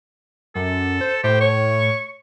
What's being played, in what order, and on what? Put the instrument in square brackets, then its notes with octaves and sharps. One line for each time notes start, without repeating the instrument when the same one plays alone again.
[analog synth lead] F#2 [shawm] A4
[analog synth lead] C5
[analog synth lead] A2 [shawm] G4 [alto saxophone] C5
[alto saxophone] C#5 [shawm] C#6